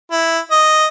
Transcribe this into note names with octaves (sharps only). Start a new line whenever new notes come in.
E4
D#5